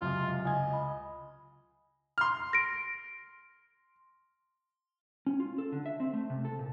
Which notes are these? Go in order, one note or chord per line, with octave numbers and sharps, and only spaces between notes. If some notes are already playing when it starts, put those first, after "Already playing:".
C#2 F#2 C3 F4
C#2 D#5 G#5 G#6
B5
C6 F6
A#6 D7
C#4
F4
A4
D3
E5
C4
A3
C3
A4
A#2